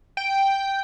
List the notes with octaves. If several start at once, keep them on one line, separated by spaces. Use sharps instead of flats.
G5